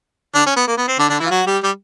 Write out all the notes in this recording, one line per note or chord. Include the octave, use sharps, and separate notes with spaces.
D3 D4
C#4
B3
A#3
B3
C4
D3 D4
D3 D4
E3 E4
F4
F#3 F#4
G3 G4
G3 G4